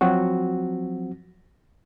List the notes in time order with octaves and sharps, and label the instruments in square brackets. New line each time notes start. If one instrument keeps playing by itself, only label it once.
[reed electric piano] F3 F#3 C4 F#4